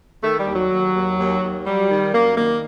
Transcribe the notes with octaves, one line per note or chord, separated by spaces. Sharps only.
D#3 A3
G3
D#2
F#3
D#2
D#2
D#2
D#2
F#3 G3
D#3
F#2 A#3
D#3 A#3